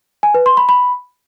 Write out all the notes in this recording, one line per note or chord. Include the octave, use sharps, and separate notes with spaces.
G#5
B4
C6
B5
B5